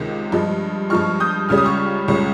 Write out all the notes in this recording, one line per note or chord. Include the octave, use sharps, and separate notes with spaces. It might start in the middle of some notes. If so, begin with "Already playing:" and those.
Already playing: C#2 C3 D#3 G#3
G2 F3 G#3
G2 F3 G#3 C#6 F6
D#6 G6
C#2 C#3 G3 F6
D#6
C#6 F6
C#2 C#3 G3